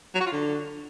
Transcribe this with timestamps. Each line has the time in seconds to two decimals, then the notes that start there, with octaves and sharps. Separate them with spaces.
0.14 F#3
0.20 F#4
0.26 F4
0.32 D3